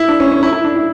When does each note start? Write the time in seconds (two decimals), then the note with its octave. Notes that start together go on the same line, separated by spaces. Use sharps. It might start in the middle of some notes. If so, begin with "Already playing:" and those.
Already playing: E4
0.08 D4
0.20 C#4
0.32 C#4
0.43 E4
0.53 E4
0.64 D4
0.76 E4